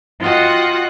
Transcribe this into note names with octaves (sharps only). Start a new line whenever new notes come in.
F4 F#4 D#5 F#5 G5